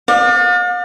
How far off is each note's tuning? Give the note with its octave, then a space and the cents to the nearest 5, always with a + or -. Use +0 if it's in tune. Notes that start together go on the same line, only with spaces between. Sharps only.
D5 +35 F5 +45